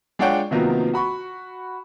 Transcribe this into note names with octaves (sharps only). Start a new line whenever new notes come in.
G#3 D4 F4 C#5 F#5 G5
C3 D#3 F3 F#3 A#3 B3
F#4 B5 C#6